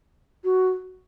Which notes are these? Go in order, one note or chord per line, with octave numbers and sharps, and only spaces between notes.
F#4